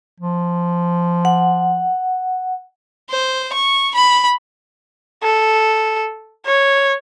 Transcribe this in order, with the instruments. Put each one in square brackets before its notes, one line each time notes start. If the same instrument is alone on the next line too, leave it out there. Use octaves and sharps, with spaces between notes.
[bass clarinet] F3
[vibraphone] F#5
[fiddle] C5
C#6
B5
[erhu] A4
C#5